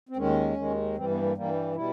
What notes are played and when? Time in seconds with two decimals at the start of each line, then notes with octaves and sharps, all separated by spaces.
0.09 C4
0.16 D#2 D#3 G#3 C#4
0.57 D#2 D#3 G#3
0.96 G2 E3 G3 C4
1.10 B3
1.23 A#3
1.36 G2 E3 G3 A#3
1.75 B2 G3 E4